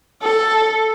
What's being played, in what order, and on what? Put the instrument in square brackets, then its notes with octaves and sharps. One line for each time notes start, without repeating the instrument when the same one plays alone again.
[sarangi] A4